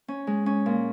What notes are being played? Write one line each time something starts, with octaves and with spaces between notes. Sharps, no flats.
C#4
G#3
C#4
A#2